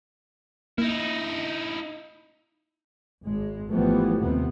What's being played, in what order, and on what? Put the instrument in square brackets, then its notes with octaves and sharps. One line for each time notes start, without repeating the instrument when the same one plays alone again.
[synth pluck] A#3 [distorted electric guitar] D#4 E4
[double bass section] G#1 G#3
G#1 E3 F3 G3 A3 B3
D#2 C3 B3